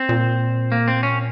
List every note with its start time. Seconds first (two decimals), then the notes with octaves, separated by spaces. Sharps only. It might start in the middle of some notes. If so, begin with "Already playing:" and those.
Already playing: C4
0.09 A#2
0.72 A#3
0.88 C4
1.03 C#4